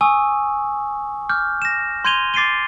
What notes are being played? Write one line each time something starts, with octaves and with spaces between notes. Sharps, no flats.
G#5 C#6 D#6 E6
D6 F6 G6
A#6 E7
C6 G6 G#6 D#7 F7 G7
D6 A6 C7 D7 D#7 G7